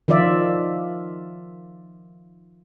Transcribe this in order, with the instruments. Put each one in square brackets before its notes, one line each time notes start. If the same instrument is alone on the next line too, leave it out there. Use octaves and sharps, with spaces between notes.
[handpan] D#3 F3 F4 D5 E5